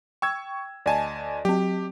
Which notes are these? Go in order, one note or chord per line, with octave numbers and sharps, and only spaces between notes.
G5 C#6 E6 G#6
D2 D5 D#5 G#5 A5
F#3 C4 G4